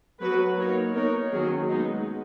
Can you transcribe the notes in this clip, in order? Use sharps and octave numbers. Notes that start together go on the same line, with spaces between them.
F#3 B3 F#4 B4
A#3 D#4 A#4 C#5
B3 D#4 A#4 C#5
D#3 F#3 A#3 C#4 G#4
G#3 B3 D#4